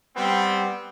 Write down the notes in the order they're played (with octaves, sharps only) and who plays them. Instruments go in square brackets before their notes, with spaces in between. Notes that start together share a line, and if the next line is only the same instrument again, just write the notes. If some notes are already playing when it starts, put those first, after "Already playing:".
[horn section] G3 B3 C4